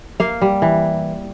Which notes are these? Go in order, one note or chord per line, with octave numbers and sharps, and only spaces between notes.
A#3 F5
G3
E3